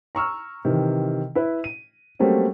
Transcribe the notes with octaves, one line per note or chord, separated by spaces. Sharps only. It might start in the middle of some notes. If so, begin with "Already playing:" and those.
A#5 C#6 E6 F6
C3 D#3 E3
E4 B4
D#7
F#3 G3 A3 A#3 C4 C#4